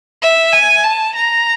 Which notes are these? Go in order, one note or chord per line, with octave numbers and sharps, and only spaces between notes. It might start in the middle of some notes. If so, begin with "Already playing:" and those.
E5
G#5
A5
A#5